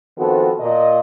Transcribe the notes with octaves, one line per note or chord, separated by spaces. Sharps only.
D#3 F3 B3 C4 F#4 A4
A#2 D#5